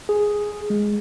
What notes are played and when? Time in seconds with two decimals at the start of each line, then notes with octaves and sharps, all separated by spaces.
0.09 G#4
0.70 G#3